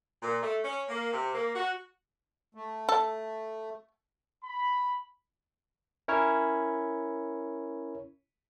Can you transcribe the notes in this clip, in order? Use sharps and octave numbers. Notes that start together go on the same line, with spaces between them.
A#2
A3
C#4
A#3
C3
A#3
F#4
A3
A4
B5
C#4 E4 A#4 C#5